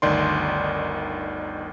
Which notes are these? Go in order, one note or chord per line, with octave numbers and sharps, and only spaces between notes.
G1 D2 D#3 D5 C6